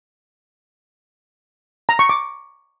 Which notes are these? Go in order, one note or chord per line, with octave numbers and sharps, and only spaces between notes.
A#5
C#6
D6